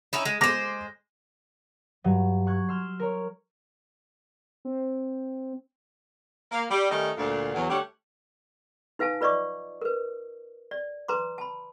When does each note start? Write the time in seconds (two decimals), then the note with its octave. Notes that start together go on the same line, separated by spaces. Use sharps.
0.13 C#4 D#4 E4
0.25 G#3
0.41 G#3 C5 D6 A#6
2.04 G2 F#3
2.47 C#6 F#6 G#6
2.69 C6 E6 F6 G6
3.00 A#4 C#5
4.65 C4
6.52 A#3
6.70 G3
6.91 D#3 G3 A3 C#4 D#4
7.18 D2 A#2
7.55 E2 F#3
7.70 D2 G3 A3 G4 C#5 F#5
8.99 D#4 B4 F5 G#5 A5
9.21 F4 B4 D5 D#5 C#6 D6
9.81 A#4 B4
10.71 D5
11.08 B4 A#5 C6 D6
11.38 A5 B5